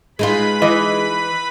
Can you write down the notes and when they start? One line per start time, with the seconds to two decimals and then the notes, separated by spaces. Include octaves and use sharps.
0.19 G#3 D#4 F4 B4 B5
0.62 E3 D#5